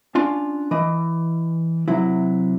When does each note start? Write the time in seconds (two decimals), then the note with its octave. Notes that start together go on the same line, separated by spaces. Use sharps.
0.15 C#4 D4 F4
0.71 E3 D#5
1.88 C3 F#3 E4